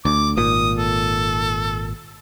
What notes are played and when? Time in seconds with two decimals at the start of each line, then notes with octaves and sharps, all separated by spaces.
0.05 D2 D6
0.37 G#1 A#2 D#6
0.78 A4